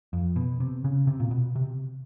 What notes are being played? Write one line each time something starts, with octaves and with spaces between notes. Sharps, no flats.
F2
B2
C3
C#3
C3
A#2
B2
C3